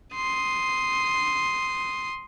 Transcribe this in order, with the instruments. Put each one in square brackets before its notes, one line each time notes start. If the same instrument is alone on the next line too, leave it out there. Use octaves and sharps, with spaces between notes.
[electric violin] C6 D#6